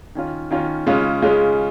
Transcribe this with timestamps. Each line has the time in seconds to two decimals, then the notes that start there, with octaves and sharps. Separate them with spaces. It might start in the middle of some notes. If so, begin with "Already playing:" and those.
0.15 D#3 C#4 F4
0.51 D#3 C#4 F4
0.87 C#3 G#3 C#4 F4
1.22 C#3 G#3 C#4 F4